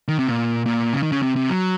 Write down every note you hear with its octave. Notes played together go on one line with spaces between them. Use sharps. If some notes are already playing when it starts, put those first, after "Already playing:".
D#3
C3
A#2
A#2
C#3
D#3
C#3
C3
C3
F#3